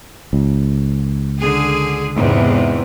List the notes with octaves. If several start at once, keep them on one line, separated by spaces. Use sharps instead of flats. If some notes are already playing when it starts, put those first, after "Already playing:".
C#2
D3 G#4
E2 G#2 C3